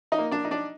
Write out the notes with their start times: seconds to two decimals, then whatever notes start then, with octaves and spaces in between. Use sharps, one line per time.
0.12 D#4 D#5
0.18 A#3
0.31 D4 D5
0.45 D#4
0.51 D4 D5